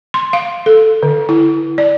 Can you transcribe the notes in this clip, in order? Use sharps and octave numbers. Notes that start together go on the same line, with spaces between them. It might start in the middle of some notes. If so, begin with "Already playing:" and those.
C6
F5
A4
D3
E4
D5